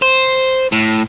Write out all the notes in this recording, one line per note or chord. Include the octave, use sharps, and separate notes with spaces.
C5
A2